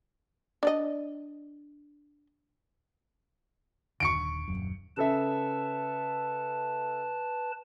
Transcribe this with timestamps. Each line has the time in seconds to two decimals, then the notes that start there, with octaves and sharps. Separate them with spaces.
0.63 D4 D5 D#5
4.00 D#1 D#2 D3 C#6 C#7 D7
4.48 D#1 F#2
4.97 C#3 A4 B4 E5 A5